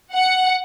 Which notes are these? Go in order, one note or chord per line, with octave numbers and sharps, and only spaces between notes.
F#5